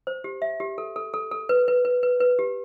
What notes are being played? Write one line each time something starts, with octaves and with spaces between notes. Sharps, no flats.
C5
G4
E5
G4
A4
A4
A4
A4
B4
B4
B4
B4
B4
G4